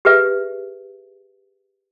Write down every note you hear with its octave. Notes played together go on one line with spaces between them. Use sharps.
G4 G#4 B4 E5